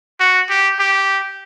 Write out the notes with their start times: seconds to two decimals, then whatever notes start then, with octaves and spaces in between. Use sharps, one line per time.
0.20 F#4
0.50 G4
0.79 G4